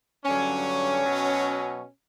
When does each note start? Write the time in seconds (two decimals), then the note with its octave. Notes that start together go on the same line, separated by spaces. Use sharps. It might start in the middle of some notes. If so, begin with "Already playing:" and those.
0.24 G2 D3 F#3 C#4
1.03 B2 F#3